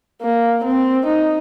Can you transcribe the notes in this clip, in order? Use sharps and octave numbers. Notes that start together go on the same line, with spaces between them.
A#3
C4
D#4